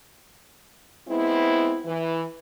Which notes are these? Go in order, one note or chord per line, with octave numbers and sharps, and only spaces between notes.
G#3 B3 C4 E4
E3